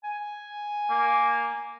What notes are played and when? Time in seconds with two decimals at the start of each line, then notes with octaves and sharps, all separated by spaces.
0.04 G#5
0.90 A#3